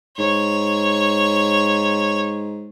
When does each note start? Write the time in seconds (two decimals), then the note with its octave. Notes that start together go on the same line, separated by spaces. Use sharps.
0.18 G#2 C#5